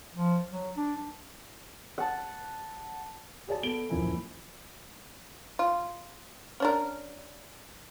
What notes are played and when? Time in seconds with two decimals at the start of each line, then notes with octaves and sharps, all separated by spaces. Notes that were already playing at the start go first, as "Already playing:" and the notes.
0.14 F3
0.51 F#3
0.77 D4
1.98 F#5 A5
3.47 F#4 G#4 D5 A5
3.63 B3 A4 D7 G7
3.90 D1 A#1 F#2 A#3 E4 G#5
5.59 F4
6.60 C#4 D4 A#4